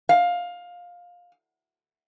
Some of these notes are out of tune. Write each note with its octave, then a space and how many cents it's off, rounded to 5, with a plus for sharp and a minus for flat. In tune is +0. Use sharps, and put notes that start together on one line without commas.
F5 +15